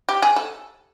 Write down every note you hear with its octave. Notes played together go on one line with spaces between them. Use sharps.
G4
G#4
A4